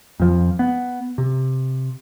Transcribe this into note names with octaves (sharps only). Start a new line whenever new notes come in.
F2 F3
B3
C3